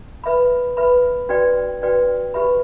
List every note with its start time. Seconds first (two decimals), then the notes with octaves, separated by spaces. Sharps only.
0.24 B4 E5 B5
0.77 B4 E5 B5
1.29 D4 F#4 B4 D5 G5
1.82 D4 F#4 B4 D5 G5
2.34 G4 B4 E5 B5